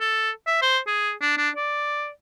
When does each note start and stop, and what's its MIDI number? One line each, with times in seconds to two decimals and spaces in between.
0.01 0.30 69
0.47 0.62 76
0.62 0.79 72
0.87 1.11 68
1.22 1.36 62
1.38 1.50 62
1.57 2.09 74